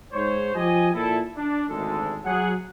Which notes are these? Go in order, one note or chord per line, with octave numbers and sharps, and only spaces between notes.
G#2 C5 C#5
F3 G4 D#5 G#5
A#2 E4 A4
D4
G#1 D2 G#3 A4
F#3 G#4 F#5